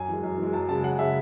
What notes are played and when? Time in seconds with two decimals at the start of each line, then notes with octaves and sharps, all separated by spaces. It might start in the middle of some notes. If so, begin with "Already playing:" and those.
Already playing: F#2 G#5
0.08 E3 G#3
0.23 F#2
0.38 E3
0.43 G#3
0.53 F#2 A5
0.69 C#3 G#3 A5
0.84 F#2 F#5
0.99 C#3 G#3 E5